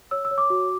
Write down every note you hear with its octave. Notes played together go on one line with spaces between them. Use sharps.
C#5 E6
E6
C#5
D6
F#4